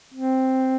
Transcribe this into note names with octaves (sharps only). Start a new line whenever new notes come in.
C4